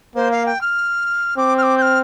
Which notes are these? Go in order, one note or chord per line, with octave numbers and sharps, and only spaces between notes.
A#3 C5
F5
G5
F6
C4 D6
F6
D6
G6
F6